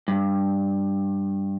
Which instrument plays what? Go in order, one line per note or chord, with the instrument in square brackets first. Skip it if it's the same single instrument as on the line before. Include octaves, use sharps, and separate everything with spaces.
[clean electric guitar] G2